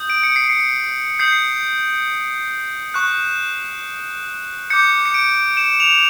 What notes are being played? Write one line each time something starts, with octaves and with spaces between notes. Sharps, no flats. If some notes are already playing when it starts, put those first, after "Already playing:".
Already playing: D#6 G6
D7
C#7
C7
C#7
D#6 G6 C7
C#6 F#6
D6 G6 C#7
C#7
D7
E7
F7